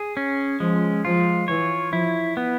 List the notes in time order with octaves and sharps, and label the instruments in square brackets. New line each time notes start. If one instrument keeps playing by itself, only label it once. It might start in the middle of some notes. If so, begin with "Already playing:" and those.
Already playing: [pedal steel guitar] G#4
C#4
[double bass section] F3 [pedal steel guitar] G#3
[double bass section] F3 [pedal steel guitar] F4
[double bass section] E3 [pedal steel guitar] C#5
[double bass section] F3 [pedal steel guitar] E4
[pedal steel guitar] B3